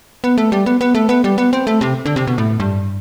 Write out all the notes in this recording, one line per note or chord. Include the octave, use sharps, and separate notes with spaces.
B3
A3
G3
B3
B3
A3
B3
G3
B3
C4
A3
C3
D3
C3
B2
A2
G2